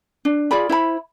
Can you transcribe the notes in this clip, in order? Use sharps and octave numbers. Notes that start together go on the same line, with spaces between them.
D4
F4 G#4 D5 B5
E4 C5 B5